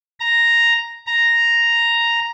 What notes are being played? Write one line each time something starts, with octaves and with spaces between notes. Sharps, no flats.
A#5
A#5